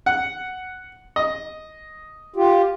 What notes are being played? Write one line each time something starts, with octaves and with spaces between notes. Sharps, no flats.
F#5
D#5
F4 G4